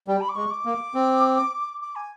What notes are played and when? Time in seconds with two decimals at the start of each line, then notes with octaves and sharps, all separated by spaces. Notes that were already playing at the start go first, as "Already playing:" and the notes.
0.08 G3 G5
0.21 B5
0.29 D6
0.36 G#3 C#6
0.51 D6
0.65 A#3
0.95 C4
1.82 D6
1.96 G#5